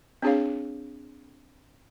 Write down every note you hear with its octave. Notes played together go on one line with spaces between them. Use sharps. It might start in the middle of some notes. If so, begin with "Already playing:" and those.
C4 D4 G#4 C#5 F5